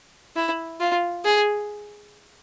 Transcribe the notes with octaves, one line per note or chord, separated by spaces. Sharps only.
E4
F4
G#4